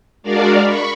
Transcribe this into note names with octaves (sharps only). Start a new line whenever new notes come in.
G#3 D4 F#4 A#4 D5 F5
B5 C#6